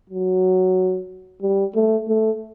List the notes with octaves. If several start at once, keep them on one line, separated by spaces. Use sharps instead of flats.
F#3
G3
A3
A3